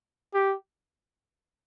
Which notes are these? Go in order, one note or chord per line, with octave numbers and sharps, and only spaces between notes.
G4